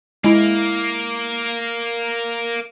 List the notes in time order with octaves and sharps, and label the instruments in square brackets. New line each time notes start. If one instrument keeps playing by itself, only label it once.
[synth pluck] G#3 E4 [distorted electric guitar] A#3